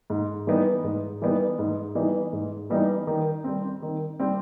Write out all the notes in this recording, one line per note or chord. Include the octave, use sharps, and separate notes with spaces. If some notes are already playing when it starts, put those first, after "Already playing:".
G#2
E3 G3 B3 D#4
G#2
E3 G3 B3 D#4
G#2
E3 G3 B3 D#4
G#2
E3 G3 B3 D#4
D#3
G3 C4
D#3
G3 C4